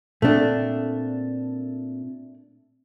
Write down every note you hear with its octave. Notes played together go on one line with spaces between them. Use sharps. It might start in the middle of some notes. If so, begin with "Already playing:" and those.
A#2 A3 C4 D4